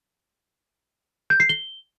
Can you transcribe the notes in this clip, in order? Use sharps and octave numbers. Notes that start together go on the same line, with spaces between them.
G6
C7
G7